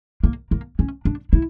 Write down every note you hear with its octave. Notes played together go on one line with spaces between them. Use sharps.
A#3
A#3
C#4
D4
E4